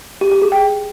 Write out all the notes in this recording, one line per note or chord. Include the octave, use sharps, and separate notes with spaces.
G4
G4
G#4
G5